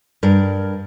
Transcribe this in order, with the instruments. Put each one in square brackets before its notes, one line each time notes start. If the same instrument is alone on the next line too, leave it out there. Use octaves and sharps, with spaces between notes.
[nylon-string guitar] G2 A#4 D5